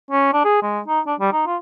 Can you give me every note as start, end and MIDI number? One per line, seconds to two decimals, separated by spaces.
0.11 0.33 61
0.33 0.43 62
0.45 0.61 68
0.62 0.80 56
0.88 1.00 63
1.07 1.15 62
1.20 1.31 55
1.33 1.46 63
1.47 1.57 65